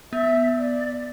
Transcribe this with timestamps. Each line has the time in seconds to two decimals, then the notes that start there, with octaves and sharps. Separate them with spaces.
0.12 B3 E5
0.58 D5